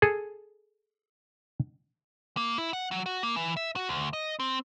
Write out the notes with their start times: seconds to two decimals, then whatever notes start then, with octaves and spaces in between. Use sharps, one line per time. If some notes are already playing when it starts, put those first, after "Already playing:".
0.02 G#4 A4
2.37 A#3
2.58 E4
2.73 F#5
2.91 F#3
3.06 F#4
3.23 A#3
3.36 E3
3.57 E5
3.76 F#4
3.89 D2
4.13 D#5
4.40 C4